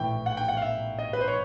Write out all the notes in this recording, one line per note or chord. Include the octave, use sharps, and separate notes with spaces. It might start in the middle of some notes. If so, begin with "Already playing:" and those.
Already playing: A#1 A2 E3 G5
F#5
G5
F#5
F5
E5
D#5
B4
C5
C#5